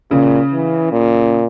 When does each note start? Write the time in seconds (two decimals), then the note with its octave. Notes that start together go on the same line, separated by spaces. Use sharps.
0.11 A#2 C#3
0.53 E3
0.92 A#2